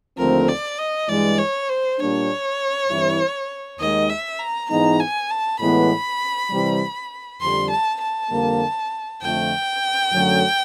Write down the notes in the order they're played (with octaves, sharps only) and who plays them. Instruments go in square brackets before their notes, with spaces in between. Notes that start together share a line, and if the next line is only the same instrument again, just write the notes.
[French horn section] D#2 D3 F3 A3 C4 [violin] A#4
[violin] D5
D#5
[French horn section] G2 E3 G#3 [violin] D5
[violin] C#5
C5
[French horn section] A#2 G3 A#3 D4 [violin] C#5
[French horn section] G2 E3 G3 C4 E4
[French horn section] D#2 D#3 G#3 [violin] D#5
[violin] E5
A#5
[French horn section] G#2 E3 G#3 B3 D#4 [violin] A#5
[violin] G#5
A5
[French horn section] A2 E3 G#3 B3 [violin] B5
[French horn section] C3 E3 G3
[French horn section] F2 D3 G3 [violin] C6
[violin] A5
A5
[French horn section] F2 D3 G3 A#3
[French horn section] F2 D3 F3 A3 [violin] G5
[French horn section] F#2 D3 F#3 A3 C#4